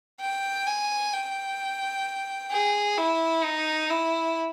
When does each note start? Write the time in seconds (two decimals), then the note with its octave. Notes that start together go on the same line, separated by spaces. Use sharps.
0.20 G5
0.67 G#5
1.13 G5
2.51 G#4
2.97 E4
3.44 D#4
3.90 E4